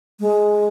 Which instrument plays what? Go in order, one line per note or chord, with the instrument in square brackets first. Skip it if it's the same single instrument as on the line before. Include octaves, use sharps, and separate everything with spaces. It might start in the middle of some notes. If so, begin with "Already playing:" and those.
[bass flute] G#3